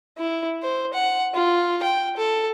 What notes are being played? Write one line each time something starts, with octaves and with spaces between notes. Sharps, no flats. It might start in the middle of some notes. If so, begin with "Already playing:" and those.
E4
C5
F#5
F4
G5
A4